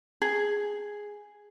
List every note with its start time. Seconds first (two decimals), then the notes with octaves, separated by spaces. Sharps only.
0.22 G#4